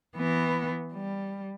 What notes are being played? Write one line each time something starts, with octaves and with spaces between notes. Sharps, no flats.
E3 B3
G3